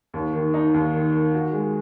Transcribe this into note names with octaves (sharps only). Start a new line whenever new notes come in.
D#2
D#3
D#4
D#2
D#3
D#3
F#4
G#3